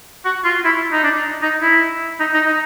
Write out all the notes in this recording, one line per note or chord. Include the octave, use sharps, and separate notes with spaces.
F#4
F4
E4
D#4
D4
D#4
E4
D#4
D#4
D#4